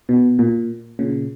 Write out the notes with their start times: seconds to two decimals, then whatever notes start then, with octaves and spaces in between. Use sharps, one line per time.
0.09 B2
0.39 A#2
0.99 A#2 C#3